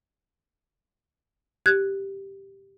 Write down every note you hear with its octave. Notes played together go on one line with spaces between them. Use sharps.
G4 F#6 G#6